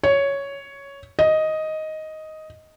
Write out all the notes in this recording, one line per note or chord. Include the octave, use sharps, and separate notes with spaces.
C#5
D#5